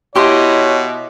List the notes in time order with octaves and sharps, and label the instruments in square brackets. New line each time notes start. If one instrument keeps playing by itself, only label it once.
[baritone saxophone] B2 [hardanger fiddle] E4 D#5 [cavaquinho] G4 C6 [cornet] C#5